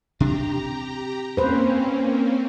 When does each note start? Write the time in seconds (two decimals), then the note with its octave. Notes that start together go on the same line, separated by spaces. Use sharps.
0.20 C3 D4 G4 A#5
1.37 A#3 C4 C#4 B4 C5